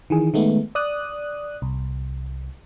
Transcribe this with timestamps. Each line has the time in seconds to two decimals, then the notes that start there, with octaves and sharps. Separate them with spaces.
0.10 D#3 E3 G#4
0.34 D#3 G#3 A3 B3
0.75 D5 D#6 F#6
1.62 C2